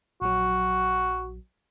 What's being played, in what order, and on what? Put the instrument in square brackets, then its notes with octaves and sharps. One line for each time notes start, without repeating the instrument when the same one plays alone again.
[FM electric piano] A#1 F#3 [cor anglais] F#4